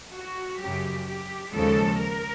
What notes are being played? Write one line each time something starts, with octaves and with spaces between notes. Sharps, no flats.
F#4
F#2 C#3 F#3 G4
G4
D#2 C#3 F3 G#3 A4
A#4